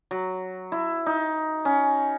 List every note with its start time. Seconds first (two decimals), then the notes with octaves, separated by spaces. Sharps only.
0.11 F#3
0.72 E4
1.06 D#4
1.65 C#4